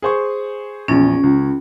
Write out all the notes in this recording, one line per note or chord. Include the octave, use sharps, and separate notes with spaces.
G#4 C5 C#6
A#1 E2 C#4
C#2